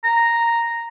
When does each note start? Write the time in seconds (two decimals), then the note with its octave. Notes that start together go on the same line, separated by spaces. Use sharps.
0.04 A#5